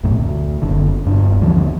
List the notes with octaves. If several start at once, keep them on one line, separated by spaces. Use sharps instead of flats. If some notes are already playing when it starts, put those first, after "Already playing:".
B1 F#2 A2
D2
F#1 D3
E1 G2 D4
D2 D3 E3 F3